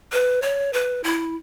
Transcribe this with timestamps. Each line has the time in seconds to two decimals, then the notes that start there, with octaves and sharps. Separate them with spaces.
0.12 B4
0.42 C#5
0.73 B4
1.04 E4